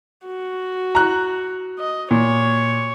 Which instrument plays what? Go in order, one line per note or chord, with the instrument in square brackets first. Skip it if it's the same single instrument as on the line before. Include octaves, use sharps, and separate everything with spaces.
[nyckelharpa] F#4
[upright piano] A#5 F#6
[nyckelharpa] D#5
[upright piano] A#2 [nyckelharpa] C#5